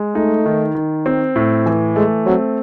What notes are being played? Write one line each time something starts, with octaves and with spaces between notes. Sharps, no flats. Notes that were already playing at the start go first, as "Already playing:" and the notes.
Already playing: G#3
A3 D#4
D#3
D#3
C4
A2
E3
G#3 A3
F#3 C4